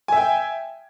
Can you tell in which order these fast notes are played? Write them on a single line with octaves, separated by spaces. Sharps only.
G#5 E5 G5